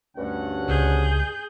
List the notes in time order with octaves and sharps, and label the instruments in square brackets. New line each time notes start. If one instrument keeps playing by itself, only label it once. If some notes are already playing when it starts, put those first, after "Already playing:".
[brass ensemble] D2 C#4 F#5 [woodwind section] G2
[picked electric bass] C#2 [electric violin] G#4 G6